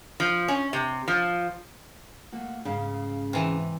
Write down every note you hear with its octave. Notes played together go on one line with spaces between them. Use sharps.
F3
C#4
C3
F3
A3 A#3 F#4
G#2 C#3 F5
C3 E3